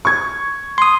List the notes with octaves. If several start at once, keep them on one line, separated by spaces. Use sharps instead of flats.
C#6 G#6
C6 D#6